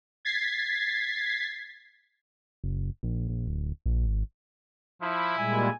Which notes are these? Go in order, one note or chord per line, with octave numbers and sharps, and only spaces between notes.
G#6 A6 B6 C7
F#1
A#1
A#1
D1
A#1
G#1
F3 E4
A#2 G3 G#3 G#5